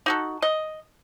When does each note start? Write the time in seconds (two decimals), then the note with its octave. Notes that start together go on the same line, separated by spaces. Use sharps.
0.06 D#4 F#4 A4
0.42 D#5